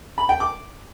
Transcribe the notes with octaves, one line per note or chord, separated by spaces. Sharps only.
B5
G5
D6